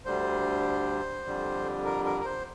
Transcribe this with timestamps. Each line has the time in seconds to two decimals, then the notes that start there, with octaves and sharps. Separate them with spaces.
0.05 D2 D3 G3 C5
1.25 F2 D3 G3
1.85 A#4
2.05 A#4
2.21 A#4
2.25 C5